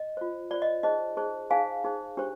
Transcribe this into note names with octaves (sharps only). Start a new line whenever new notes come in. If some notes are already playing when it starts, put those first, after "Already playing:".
Already playing: D#5
F4 C5
F4 C5 D5
D#5
D#4 G#4 C5 D#5
D#4 G#4 C5
D#4 G#4 C5 F5 G#5
D#4 G#4 C5
D4 G4 C5